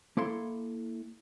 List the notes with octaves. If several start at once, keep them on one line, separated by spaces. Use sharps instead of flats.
A#3 E4 A4 C6